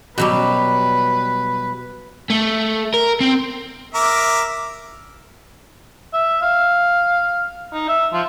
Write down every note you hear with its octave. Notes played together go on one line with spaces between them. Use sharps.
B2 F#3 G3 B4
A3
A#4
C4
A#4 E5 D6
E5
F5
D#4
E5
F3